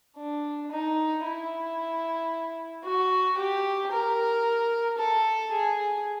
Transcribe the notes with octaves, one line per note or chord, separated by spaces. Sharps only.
D4
D#4
E4
F#4
G4
A#4
A4
G#4